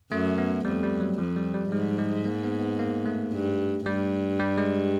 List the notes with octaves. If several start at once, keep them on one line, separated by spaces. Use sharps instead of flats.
F#2 A3
B3
F2 G3
G3
F#3
F2 F3
G3
G3
G#2 G#3
G#3
A#3
B3
B3
A#3
A3
G2
G2 G3
G3
G#3